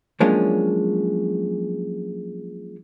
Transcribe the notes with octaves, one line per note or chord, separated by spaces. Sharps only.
F3 F#3 G#3 A#3 C#4 D4